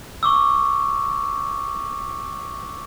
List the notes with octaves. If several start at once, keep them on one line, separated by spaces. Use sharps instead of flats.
C#6 D6 E6